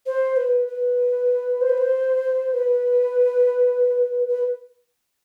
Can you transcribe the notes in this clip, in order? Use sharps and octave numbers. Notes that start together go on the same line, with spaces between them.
C5
B4
B4
C5
B4
C5
B4
B4